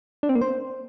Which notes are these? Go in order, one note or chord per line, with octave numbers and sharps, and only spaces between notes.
D4
C4
A#3
C5